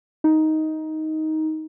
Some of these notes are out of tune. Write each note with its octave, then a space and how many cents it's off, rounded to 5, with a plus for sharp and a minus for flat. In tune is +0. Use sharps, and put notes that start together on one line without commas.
D#4 +10